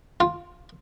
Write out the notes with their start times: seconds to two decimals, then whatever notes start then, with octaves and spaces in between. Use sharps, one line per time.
0.20 F4